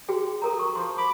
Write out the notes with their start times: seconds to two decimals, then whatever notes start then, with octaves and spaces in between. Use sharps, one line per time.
0.09 F#4 G#4 G5
0.42 A4 A#4 A#5
0.59 C#6
0.75 F3 C6
0.98 B5 D6